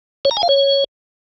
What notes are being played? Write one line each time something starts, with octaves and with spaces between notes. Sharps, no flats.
C#5
A#5
G#5
F5
C#5